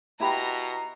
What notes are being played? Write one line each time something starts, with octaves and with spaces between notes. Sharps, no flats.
B2 E4 G4 A#5 B5